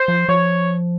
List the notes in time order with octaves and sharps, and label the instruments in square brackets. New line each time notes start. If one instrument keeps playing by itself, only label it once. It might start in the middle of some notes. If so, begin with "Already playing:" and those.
Already playing: [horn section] C5
[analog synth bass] F3
[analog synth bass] F3 [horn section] C#5